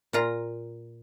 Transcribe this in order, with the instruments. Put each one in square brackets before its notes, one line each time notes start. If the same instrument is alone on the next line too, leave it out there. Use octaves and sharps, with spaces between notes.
[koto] A#2 F4 A#5